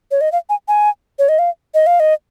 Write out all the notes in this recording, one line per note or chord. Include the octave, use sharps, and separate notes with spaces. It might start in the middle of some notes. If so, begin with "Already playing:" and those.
C#5
D#5
F5
G#5
G#5
C#5
D#5
F5
D#5
F5
D#5